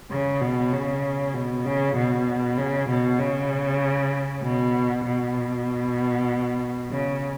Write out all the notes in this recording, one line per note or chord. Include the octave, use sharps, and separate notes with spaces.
C#3
B2
C#3
B2
C#3
B2
C#3
B2
C#3
B2
B2
C#3